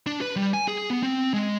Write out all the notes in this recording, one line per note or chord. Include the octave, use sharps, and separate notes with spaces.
D4
B4
G3
G#5
G#4
B3
C4
G#3